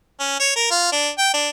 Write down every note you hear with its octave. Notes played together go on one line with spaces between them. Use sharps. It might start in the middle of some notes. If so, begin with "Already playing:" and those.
C#4
C#5
A#4
F4
D4
G5
D4